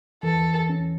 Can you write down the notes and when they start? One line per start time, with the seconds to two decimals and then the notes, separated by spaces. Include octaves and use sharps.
0.23 E3 A4
0.69 C#4